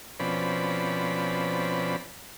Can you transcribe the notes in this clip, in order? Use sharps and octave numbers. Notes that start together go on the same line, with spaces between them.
B2 F3 C4 C#4 D5 B5